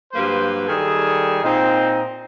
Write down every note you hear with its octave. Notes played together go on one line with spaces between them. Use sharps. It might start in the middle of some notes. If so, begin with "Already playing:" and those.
G2 F#3 A#3 B4 C5
D#3 G3 G#4 A4
A#2 C4 D#4